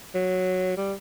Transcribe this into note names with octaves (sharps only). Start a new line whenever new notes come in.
F#3
G3